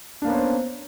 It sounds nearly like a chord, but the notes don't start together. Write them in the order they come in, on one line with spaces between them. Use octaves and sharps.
D4 A#3 B3 C#4 C5